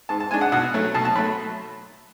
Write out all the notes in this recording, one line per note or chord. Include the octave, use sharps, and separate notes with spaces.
G#2 A5
A5
G#3 D4 G#5
F#5
B2 F#5
F#3 A3
B2 A5
A5
F#3 A3 B5